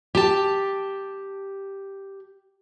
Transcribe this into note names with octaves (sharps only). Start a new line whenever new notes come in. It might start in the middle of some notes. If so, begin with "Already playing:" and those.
G4 A5